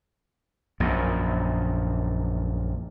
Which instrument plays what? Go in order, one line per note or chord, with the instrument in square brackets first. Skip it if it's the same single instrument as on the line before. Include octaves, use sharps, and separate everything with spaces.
[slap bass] A#1 F#2 A#2